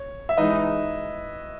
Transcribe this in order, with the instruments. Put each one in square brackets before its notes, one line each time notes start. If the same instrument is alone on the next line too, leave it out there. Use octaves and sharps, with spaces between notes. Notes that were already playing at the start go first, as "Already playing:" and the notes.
Already playing: [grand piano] C#5
E5
[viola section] E3 G#3 D#4 [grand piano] B4 D#5